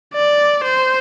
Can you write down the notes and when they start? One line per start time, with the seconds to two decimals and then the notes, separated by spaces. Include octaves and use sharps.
0.14 D5
0.64 C5